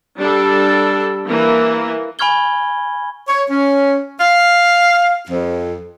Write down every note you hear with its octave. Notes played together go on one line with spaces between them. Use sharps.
G3 D4 A4
E3 A#3
G#5 B5 C#6 F6 G#6 G7
C#5
C#4
F5
F2